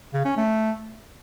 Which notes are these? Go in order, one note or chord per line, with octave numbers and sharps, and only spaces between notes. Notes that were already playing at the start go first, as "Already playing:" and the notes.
C#3
C#4
A3